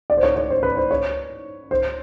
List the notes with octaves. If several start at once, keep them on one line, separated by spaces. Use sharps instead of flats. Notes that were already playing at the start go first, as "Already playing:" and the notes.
D5
C5
C#5
C#5
C5
B4
C5
C#5
C5